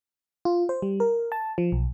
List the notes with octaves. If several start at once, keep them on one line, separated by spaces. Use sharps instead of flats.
F4
C5
G3
A#4
A5
F3
B1